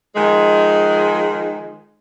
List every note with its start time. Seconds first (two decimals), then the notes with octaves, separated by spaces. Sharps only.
0.16 D#3 F3 G#3